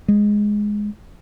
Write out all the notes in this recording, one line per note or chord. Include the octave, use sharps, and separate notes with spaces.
G#3